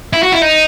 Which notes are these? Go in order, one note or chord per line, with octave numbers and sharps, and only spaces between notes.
E4
F#4
E4
D#4